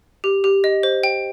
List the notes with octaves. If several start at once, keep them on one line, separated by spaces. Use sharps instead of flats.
G4
G4
D#5
C5
G5